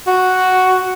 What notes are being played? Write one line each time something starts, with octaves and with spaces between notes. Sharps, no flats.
F#4